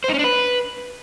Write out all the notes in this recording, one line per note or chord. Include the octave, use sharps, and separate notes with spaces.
C5
D#4
C#4
D4
B4